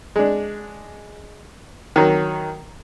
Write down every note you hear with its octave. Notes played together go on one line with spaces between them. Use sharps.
G#3 D4
D#3 F#3